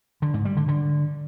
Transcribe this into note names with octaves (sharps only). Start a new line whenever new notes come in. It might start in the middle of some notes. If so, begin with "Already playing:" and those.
D3
G#2
G3
D3
D3